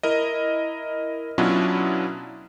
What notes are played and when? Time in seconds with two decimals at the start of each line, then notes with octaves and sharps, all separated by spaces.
0.03 E4 A#4 D#5
1.38 B2 F#3 C#4 D4 E4 F4